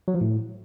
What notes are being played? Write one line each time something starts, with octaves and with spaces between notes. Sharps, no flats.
F#3
F3
A2